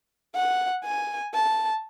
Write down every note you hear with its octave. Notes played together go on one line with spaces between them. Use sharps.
F#5
G#5
A5